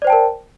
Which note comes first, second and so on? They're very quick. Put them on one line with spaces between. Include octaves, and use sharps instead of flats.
D5 C5 G5 A5 A#4